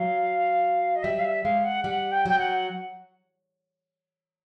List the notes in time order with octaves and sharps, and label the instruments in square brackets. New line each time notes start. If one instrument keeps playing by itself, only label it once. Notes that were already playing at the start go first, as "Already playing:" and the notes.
Already playing: [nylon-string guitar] F#3 [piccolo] F5
[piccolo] D#5
[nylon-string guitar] G3 [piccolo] E5
[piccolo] F5
E5
[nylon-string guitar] G#3 [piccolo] F5
[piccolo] F#5
[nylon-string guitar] G3 [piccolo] F#5
[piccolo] G5
[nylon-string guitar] F#3 [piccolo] G5
[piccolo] F#5